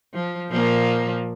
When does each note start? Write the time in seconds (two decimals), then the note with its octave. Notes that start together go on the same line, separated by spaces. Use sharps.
0.14 F3
0.50 A#2 F3 A#3